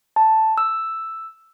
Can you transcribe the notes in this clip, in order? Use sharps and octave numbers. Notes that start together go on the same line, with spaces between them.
A5
E6